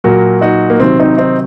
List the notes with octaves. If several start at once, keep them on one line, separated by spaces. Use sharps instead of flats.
A#2 F#3 F#4 A#4
D#4 F#4
A#3
C3 D#3 F#3 C4
C4 D#4
C4 D#4